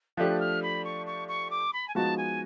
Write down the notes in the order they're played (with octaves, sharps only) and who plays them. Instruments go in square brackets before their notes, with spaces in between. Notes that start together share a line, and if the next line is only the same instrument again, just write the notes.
[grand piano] F3 A3 D4 G4 [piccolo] F#6
[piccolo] F6
B5
C#6
C#6
C#6
D6
B5
G#5
[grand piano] F3 G#3 B3 D#4 F#4 [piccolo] A5
[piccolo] G#5